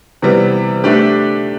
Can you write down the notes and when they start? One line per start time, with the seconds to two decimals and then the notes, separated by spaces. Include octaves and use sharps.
0.22 C3 E3 G3 B3
0.83 A3 D4 G4 B4